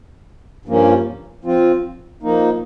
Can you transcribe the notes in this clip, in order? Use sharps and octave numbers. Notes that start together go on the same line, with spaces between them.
G2 F3 A#3 C#4
F3 C4 F4
F3 A#3 D#4